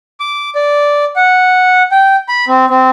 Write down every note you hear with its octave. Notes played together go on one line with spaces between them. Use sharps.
D6
D5
F#5
G5
B5
C4
C4